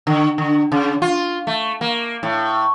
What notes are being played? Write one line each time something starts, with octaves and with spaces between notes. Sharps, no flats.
D3
D3
C#3
F4
A3
A#3
A2